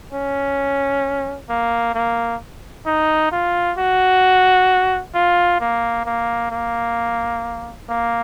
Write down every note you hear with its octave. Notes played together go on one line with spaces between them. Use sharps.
C#4
A#3
A#3
D#4
F4
F#4
F4
A#3
A#3
A#3
A#3